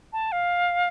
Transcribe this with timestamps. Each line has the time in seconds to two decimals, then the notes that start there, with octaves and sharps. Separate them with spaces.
0.13 A5
0.32 F5